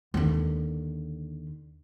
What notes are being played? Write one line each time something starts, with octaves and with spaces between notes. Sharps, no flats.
D#2 D3